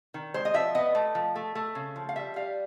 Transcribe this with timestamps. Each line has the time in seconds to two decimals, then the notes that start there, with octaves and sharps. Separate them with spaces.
0.14 D#3
0.34 G#3 C5
0.45 D#5
0.54 F3 E5
0.75 B3 D#5
0.95 A3
1.15 F3
1.36 A3
1.55 A3
1.75 C#3
1.96 F3
2.09 F5
2.16 G3 E5
2.36 G3 F5